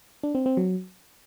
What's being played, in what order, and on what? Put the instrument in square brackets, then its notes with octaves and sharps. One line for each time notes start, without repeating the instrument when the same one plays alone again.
[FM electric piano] D4
C4
C4
F#3